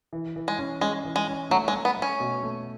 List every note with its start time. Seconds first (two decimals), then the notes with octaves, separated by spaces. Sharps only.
0.13 E3
0.36 E3
0.48 G#3
0.59 C#4
0.81 G#3 C#4
1.05 E3
1.16 G#3
1.28 C#4
1.50 F#3 A3
1.68 G#3
1.73 A3
1.85 B3
1.97 A3
2.02 C#4
2.20 B2
2.43 A3